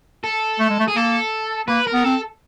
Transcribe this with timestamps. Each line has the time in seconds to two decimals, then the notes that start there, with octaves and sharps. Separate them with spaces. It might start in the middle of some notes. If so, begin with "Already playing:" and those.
0.24 A4
0.60 A3
0.70 G#3
0.79 A3
0.88 G#4
0.96 A#3 A4
1.68 A#3 B4
1.87 A#4
1.93 B3
2.04 C4 A4